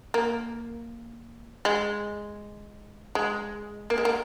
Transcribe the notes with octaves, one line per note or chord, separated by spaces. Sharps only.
A#3
G#3
G#3
A#3
G#3
A#3